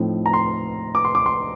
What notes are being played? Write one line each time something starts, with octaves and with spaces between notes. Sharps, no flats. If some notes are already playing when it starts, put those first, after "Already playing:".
Already playing: A2 F3 C4 D#4
A#5
C6
D6
C6
D6
C6